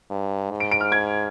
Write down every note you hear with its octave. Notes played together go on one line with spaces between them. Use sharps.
G2
G#2
D7
D7
F6
G#6